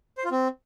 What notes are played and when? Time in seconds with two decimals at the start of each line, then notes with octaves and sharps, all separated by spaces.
0.18 C5
0.24 F4
0.31 C4